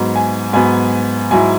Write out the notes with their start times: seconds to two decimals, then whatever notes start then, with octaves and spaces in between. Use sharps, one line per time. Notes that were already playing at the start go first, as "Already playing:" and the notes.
Already playing: G#2 F#3 B3
0.16 G#5
0.53 G#2 F#3 B3 G#5
1.31 G#2 F#3 E4 G#5